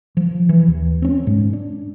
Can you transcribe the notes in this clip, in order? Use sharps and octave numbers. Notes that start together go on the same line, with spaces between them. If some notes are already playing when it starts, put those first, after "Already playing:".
F3
E3
D#2
C4 C#4
G#2
D4